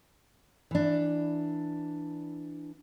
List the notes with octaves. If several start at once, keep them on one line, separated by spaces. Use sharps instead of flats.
E3 D4